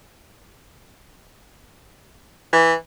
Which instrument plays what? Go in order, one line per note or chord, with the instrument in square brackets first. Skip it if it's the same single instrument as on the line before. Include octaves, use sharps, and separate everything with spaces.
[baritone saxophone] E3